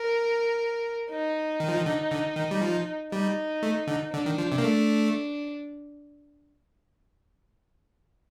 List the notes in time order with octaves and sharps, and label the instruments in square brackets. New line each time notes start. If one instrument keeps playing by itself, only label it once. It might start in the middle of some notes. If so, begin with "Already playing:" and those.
Already playing: [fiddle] A#4
D#4
[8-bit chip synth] D#3
F3
D#3
D3
D3
D#3
G3
F3
[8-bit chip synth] G3 [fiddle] D#4
[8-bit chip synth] A3
D3
[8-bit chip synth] D3 [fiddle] D4
[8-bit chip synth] D#3
F3
C3
A#3
A3